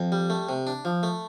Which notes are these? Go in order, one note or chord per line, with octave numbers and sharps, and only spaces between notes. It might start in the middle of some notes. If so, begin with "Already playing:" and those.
Already playing: F2
G3
A3
C3
D4
F3
A3